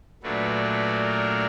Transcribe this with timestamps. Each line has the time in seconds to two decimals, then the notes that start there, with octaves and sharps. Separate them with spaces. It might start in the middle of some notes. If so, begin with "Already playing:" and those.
0.23 A#2 F#3 A3 D4 B4
0.63 B4
1.02 A#4